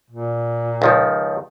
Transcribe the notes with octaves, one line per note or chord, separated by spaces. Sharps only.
A#2
C#2 D#3 F3